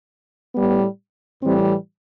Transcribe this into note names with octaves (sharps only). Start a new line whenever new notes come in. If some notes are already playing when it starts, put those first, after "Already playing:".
A2 G3 B3
A2 E3 G3 C4